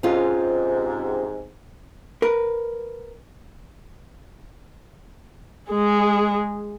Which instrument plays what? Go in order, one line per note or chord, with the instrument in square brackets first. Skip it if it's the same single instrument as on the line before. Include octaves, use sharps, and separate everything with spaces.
[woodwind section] G#2 C3 [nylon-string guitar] C#4 F4
[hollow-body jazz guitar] A#4 B4
[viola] G#3 G#4